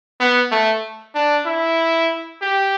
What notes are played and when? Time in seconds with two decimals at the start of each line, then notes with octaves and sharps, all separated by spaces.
0.20 B3
0.51 A3
1.15 D4
1.46 E4
2.42 G4